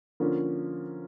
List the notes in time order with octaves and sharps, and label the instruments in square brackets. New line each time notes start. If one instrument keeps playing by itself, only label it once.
[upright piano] D3 F3 A#3 C#4